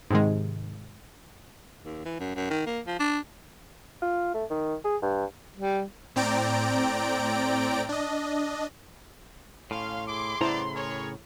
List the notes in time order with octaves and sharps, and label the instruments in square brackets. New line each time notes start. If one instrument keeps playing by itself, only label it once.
[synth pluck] G#2 C3 D#3 G#3
[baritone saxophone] D#2
E3
F#2
F#2
D#3
A#3
F3
D4
[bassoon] F4
A3
D#3
G#4
G2
[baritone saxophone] G3
[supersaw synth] A2 C4 D5 G5 A#5 D7
D4 D#5
[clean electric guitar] A2 [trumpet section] C#4 F5 [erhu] C6
[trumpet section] E4 G#4 D6 [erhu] C6
[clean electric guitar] A2 C#3 A#5 [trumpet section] B3 D5 [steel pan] E4 C5 A5
[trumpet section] G#4 A#4 C#5